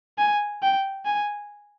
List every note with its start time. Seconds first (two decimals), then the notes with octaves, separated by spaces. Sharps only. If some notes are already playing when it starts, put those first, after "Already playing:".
0.18 G#5
0.62 G5
1.05 G#5